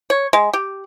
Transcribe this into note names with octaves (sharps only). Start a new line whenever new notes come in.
C#5
G#3
G4